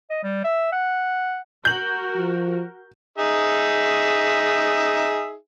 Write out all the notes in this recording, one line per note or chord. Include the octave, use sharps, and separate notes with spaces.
D#5
G3
E5
F#5
F#4 A#4 G6 F#7
F3
D#4 G#4 E5